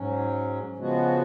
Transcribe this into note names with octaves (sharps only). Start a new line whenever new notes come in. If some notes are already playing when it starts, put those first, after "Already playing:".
Already playing: G#2 F#3 C#4
C#3 F3 G#3 B3 F#4